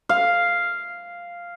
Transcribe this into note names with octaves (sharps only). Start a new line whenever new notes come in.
F5